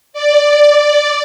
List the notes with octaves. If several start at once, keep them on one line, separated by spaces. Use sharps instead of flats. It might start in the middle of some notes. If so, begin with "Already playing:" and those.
D5